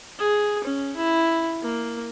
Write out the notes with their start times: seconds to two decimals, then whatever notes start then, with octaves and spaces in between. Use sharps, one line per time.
0.19 G#4
0.64 C#4
0.96 E4
1.62 A#3